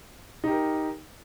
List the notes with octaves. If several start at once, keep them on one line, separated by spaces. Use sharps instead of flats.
D#4 G4 A#4